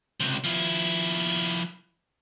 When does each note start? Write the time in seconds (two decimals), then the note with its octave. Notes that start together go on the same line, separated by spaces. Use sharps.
0.20 C#2 C3
0.44 F3 E4